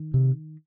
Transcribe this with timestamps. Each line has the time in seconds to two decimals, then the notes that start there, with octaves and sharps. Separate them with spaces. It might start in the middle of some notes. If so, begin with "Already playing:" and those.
Already playing: D#3
0.14 C3